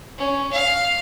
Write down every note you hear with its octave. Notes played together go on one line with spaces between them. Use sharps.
C#4
F5